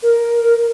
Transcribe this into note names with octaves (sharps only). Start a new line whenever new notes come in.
A#4